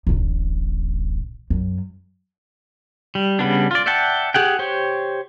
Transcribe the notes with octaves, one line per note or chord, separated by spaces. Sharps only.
D1 A1
F#2
G3
C#3 G3 B3 D4
F4 D5
D5 E5 F#5 G5 A5
G4 G#4 F#5 G5
G4 C5 C#5